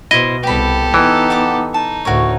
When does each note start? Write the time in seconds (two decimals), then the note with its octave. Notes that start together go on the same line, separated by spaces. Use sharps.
0.11 B2 E4 C5 D#5
0.43 C2 B3 G4 A4 G5 B5
0.94 E3 B3 D#4
1.30 F#5 A5 D6
1.74 D#4 A5
2.05 D2 A2 F#4 A#4 C#5